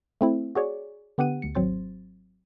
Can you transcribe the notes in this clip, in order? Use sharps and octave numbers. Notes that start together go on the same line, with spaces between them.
A3 C4 E4
F#4 G#4 C#5 D5
D3 B3 G4 F#5 D#7
D2 C#7
G#1 F#3 C4 C5 A6